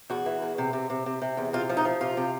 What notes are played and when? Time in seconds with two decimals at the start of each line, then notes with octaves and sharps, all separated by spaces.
0.10 E2 F#4
0.26 E3
0.42 E2
0.58 C3
0.73 C3
0.90 C3
1.06 C3
1.22 C3
1.37 E2
1.53 C3 F4
1.69 F3
1.77 D#4
1.85 F3
2.01 C3 F4
2.17 C3